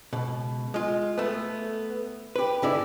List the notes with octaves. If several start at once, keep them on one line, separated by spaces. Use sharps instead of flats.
C#2 B2
G#3 F4
A3 B3
G4 B4
G#2 D3 E4 D5